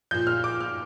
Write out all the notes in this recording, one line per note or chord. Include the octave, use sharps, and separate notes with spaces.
A#2 F3 G6
F6
D6
F6